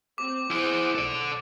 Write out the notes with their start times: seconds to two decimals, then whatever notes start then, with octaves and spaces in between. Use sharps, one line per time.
0.18 C4 D6
0.50 E4 G#4 C5 F#5 F#6
0.95 B1 A4 D5